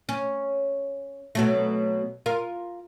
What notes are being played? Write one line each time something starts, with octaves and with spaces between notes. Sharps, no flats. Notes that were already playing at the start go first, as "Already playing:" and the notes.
C#4
B2 F#3 A3
F4 A#4